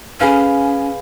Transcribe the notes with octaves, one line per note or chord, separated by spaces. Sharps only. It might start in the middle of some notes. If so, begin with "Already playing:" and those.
C#4 G#4 B4 F5